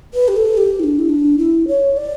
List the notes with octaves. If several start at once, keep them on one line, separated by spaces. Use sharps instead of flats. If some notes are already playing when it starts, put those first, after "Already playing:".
B4
G4
A4
G4
E4
D4
E4
D4
E4
C#5
D5